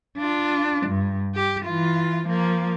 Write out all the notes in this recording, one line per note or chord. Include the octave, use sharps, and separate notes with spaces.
D4 F4
G2
G4
E3 F4
F3 A#3